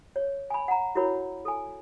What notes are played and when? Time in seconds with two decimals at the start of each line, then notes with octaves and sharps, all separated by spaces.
0.16 C#5
0.50 G#5 B5
0.68 F#5 A#5
0.95 E4 F#4 A#4 C#5 B5
1.45 A4 G#5